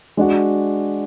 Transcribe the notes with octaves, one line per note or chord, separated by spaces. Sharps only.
G#3 D4 F#4